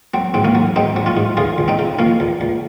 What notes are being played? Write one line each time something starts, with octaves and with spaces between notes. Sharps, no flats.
F#3 C4
G#2 C4
A#3 C#4
F#3
G#2 C4 D#4
F#3
C#4 F4
G#2
C#2 F4 G#4
C#2
C4 D#4
C#3
F3 A#3 C#4
C#2
C#2